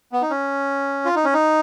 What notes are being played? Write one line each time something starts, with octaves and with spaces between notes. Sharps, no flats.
B3
D#4
C#4
F4
D#4
C#4
D#4